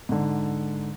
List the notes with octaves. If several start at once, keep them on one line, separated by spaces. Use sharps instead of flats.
G#2 D3